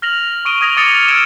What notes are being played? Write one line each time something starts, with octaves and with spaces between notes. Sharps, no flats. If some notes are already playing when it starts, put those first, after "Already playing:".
F6 A#6 F7 F#7
C#6 D#6 D7 D#7 G7
D#6 G#6 A#6 D#7
D6 D#6 A6 C#7 G7
F6
E6 F6 G#6 C#7 D7 E7